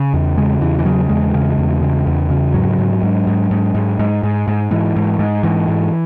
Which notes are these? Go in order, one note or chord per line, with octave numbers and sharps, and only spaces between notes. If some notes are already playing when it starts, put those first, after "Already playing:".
Already playing: C#3
E2
C#3 G#3
E2 E3
E3
C#3 F#3
E2 G#3
C#3
E2
C#3
E2
C#3
G#2 F#3
G#2
G#2
G#2
G#2
G#2
G#2
G#2
G#2
G#2 E3
G#2
G#2
G#2 E3
G#2